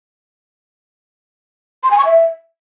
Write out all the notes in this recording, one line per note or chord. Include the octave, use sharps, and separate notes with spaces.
C6
G#5
C#6
E5